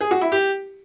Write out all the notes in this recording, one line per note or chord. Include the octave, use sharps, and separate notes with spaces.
G#4
F#4
E4
G4